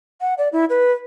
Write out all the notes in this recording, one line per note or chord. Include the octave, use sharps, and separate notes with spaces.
F#5
D5
E4
B4